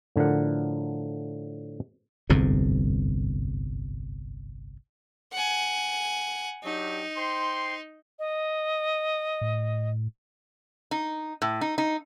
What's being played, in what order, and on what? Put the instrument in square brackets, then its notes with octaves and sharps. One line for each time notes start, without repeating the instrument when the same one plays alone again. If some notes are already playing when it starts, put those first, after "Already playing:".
[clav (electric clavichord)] A2 D3 F3 A#4 F#5
[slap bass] G1 C2 F2 G#2
[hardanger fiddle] F#5 G#5
[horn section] F#3 D4 G4 [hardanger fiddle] D#4
[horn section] C5 G5 C6
[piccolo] D#5
[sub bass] A2
[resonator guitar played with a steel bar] D#4
A2
D#4
D#4